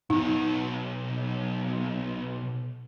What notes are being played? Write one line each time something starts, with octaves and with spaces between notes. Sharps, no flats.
B1 B2 D#4